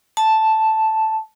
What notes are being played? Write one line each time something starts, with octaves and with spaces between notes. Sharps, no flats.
A5